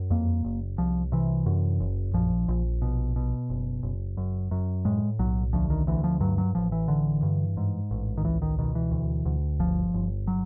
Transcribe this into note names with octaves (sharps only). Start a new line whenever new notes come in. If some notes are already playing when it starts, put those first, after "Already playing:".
Already playing: F#2
F2 A#3
F#1
C2 F3
C3 E3
F#2
F#1
A#1 F3
A#1
B2
B2
F#1
F#1
F#2
F#2
A2 G#3
B1 F#3
D2 F3
D#3
D2 E3
F3
G2 F#3
F#3
A1 F3
E3
D3
G2
G#2
A1
D#3
C#2 E3
D#3
B2 D#3
E3
D2
D2
G1 F3
G1
F#3